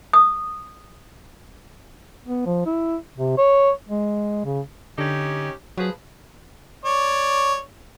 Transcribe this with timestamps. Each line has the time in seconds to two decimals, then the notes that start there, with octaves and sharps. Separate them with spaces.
0.13 D#6
2.27 B3
2.46 F3
2.66 E4
3.16 C3
3.38 C#5
3.89 G#3
4.45 C#3
4.98 D3 C#4 D#4 G4
5.78 F3 F#3 G#4 B4
6.85 C#5 D5